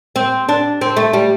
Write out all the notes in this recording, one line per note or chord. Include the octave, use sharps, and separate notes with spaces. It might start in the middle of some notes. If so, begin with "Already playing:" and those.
C4
D4
C4
A3
G3